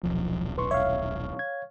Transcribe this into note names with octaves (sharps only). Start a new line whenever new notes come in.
D#1 B1 F3
B4 C6 C#6
C#5 E5 F5
G#6